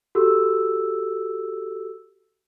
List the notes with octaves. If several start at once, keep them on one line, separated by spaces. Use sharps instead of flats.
F#4 G4 A4 E6